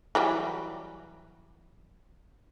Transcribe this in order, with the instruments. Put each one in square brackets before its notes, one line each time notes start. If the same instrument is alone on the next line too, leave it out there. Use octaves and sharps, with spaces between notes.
[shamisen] E3 F#3 G3